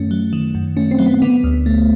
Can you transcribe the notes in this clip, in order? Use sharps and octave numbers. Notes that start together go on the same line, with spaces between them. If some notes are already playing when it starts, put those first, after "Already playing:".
Already playing: F#2 D#3 A3 C#4
F#3
D#3
F#2
A3 C#4
C4
F#3
B3
D3 B3
D2
A3